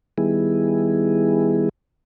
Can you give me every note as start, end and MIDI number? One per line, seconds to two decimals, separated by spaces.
0.18 1.69 51
0.18 1.69 55
0.18 1.69 59
0.18 1.69 64
0.18 1.69 68